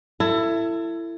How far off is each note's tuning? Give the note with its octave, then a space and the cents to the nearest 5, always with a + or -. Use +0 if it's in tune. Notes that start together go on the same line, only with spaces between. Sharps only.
E4 +20 A4 +30